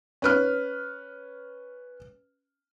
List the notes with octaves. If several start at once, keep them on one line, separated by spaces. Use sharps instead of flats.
C#4 B4 F6